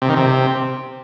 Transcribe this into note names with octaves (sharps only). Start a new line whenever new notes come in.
C3
D#3
C3